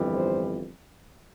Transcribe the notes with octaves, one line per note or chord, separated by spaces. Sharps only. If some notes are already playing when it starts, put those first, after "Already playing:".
Already playing: G1 F2 E3 G3
C5